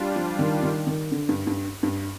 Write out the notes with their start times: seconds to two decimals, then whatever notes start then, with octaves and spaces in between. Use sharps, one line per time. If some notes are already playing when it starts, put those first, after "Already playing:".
Already playing: G3 D4 F4
0.16 F3
0.39 D#3
0.63 D#3
0.87 D#3
1.11 D3
1.29 G2
1.47 G2
1.83 G2